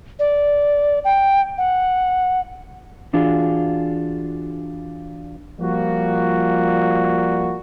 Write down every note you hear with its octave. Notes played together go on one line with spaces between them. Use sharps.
D5
G5
F#5
E3 D4 F4 F#4 G#4
F3 G3 A#3 F#4